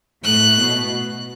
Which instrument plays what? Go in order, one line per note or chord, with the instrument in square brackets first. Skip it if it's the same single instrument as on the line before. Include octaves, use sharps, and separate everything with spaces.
[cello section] A2 [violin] F#6
[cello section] B2